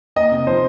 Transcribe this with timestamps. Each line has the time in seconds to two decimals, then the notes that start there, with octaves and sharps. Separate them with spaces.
0.16 A#3 D#5
0.31 C3
0.47 F3 C5